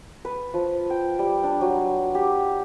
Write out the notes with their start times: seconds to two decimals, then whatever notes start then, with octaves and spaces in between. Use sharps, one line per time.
0.25 B4
0.54 F3
0.90 G5
1.19 G3
1.43 D4
1.61 F#3
2.15 G4